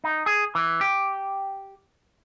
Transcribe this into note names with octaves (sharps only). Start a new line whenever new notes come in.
D#4
G#4
E3
G4